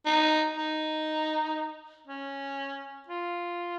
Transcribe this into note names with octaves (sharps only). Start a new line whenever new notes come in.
D#4
D#4
C#4
F4